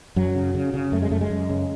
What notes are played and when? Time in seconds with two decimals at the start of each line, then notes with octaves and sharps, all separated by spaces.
0.16 F#2 F#3
0.36 C#3
0.55 C#3
0.74 C#3
0.92 F#2 A3
1.02 G#3
1.11 F#2 A3
1.21 G#3
1.30 F#2
1.50 C#3